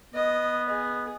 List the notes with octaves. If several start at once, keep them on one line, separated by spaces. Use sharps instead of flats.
B3 D#5
G#4